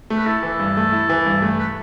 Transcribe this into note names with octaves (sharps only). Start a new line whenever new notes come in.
A3
B4
E4 A4
E3
G2
A3
E4
E3
G2
A3
B4